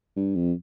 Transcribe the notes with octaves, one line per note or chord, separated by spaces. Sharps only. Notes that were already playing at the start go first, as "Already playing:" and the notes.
G2
F2